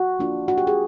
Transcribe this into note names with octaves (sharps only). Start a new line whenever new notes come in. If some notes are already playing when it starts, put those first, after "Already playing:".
Already playing: F#4
F3 A#3 D4 F4
F#4
G4
G#4